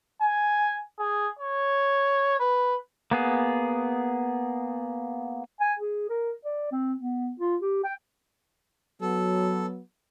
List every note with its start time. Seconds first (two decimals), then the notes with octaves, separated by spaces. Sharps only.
0.21 G#5
0.99 G#4
1.39 C#5
2.39 B4
3.11 A#3 B3 G#4
5.61 G#5
5.79 G#4
6.10 A#4
6.45 D5
6.72 C4
6.99 B3
7.40 F4
7.62 G4
7.84 G5
9.01 F#3 B3 A4